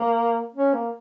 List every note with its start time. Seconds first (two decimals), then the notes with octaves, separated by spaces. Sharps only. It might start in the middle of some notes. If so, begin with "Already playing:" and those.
Already playing: A#3
0.55 C#4
0.74 A#3